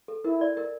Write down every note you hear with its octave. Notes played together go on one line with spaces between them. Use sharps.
A4
E4 A#4
D5
A#4